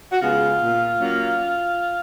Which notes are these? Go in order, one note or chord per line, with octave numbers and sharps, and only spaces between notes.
F#4
C#3 G#3 B3 F4
A#2
F#3 A#3 C#4